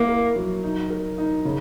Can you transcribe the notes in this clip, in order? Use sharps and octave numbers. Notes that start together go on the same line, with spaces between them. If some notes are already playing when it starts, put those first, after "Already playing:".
Already playing: A#3 E4
A#4
F#3
D#4
A#4
D#4
C#3